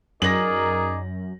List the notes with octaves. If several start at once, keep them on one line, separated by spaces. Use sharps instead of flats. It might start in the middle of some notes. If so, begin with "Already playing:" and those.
F#2 D#4 G#4 A#4 D5 A#6 F#7